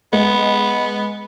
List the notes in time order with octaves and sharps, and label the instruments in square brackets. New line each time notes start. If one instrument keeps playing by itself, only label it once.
[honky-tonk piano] G#3 [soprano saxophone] B3